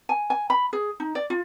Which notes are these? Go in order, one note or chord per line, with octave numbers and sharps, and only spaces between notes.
G#5
G#5
B5
G#4
D#4
D5
F4